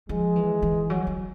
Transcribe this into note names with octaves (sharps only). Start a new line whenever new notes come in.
F3 G#3
E3
E3
F#3
F#3